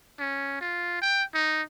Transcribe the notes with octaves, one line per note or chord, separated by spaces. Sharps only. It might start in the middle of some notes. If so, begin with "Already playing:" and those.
C#4
F4
G5
D#4